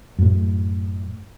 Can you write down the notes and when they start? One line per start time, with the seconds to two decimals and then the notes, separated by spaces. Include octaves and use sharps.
0.19 F#2 A2